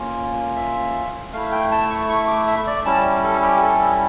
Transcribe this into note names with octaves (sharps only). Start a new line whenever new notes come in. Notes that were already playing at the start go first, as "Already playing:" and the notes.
Already playing: A#3 C#4 F4
E5
A3 E4 F5
G5
A5
C#6
C#6
D6
E5
D5
G3 C#4 E4 A5
A4
G4
A4